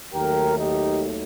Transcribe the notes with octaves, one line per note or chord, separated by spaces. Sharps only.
D#2 D#3 F#3 A3 G4 A#4
D#4 G4